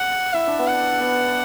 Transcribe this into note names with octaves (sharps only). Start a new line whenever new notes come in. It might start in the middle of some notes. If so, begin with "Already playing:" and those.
Already playing: F#5
E4 E5
D4
B3
F#5
D4
B3